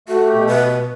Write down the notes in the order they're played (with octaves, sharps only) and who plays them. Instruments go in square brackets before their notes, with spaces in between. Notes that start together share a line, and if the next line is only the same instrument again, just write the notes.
[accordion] A3 [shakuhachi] F#4
[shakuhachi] G4
[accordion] B2
[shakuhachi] B4